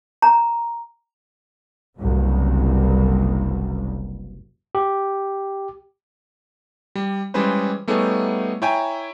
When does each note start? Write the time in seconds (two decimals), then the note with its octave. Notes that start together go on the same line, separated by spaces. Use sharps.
0.22 A#5
1.98 F#1 C2 G2
4.75 G4
6.95 G3
7.34 E3 G3 G#3 C#4 B4 C5
7.88 G3 A3 B3 D#4 G#4 C#5
8.62 E4 C#5 G5 G#5 A#5